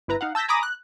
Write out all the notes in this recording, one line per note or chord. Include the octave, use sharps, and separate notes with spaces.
G1 E4 B4 A#5
D#4 F5 F#5
A5 E6 G6 A#6 B6
G#5 A#5 B5 D6 D#6 A#6
F#6